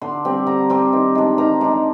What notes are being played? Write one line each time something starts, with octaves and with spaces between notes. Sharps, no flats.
D3 C6
G3 C4
D3 A#5
G3 C4 C6
D#3
G#3 D4
D#3 A#5
G#3 D4